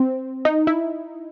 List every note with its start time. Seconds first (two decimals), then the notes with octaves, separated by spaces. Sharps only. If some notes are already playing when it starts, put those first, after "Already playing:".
Already playing: C4
0.45 D#4
0.67 E4